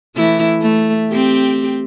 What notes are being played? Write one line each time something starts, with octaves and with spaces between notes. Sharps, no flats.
E3 A3 E4
A3
C4 G4